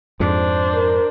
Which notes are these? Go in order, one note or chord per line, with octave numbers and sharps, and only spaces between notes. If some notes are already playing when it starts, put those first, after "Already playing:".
F2 G#2 D4 C5
A#4